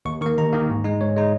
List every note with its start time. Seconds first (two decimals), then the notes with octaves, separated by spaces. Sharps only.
0.05 D#2 C#6
0.21 D#3 A#3 C#6
0.37 D#2 A#5
0.53 D#3 A#3
0.69 G#2
0.84 G#3 D#4
1.01 G#2 C#5
1.16 G#3 D#4